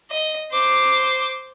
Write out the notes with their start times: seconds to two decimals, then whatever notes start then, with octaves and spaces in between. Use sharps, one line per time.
0.11 D#5
0.52 C5 D6